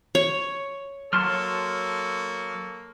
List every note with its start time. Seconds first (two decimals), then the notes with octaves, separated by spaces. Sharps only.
0.15 C#5
1.13 F#3 A#3 A4 A5 C6 C#6 F6